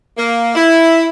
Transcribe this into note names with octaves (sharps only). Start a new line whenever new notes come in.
A#3
E4